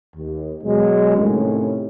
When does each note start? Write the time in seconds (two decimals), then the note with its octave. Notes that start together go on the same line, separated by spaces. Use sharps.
0.16 D#2
0.64 B2 F#3 G#3
1.16 A2 C3 D#3 C#4